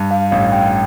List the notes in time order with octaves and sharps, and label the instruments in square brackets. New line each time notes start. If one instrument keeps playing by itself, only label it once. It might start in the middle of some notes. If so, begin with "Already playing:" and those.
Already playing: [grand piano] G2
[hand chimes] F5
[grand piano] A1 [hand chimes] F5
[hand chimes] G5